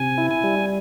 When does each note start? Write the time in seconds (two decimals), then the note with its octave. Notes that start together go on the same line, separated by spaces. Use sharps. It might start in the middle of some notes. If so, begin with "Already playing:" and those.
Already playing: C3 G#5
0.18 E4
0.31 G#5
0.43 G3